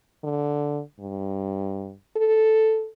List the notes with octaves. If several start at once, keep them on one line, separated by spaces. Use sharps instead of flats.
D3
G2
A4